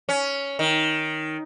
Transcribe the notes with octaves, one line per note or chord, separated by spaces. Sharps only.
C#4
D#3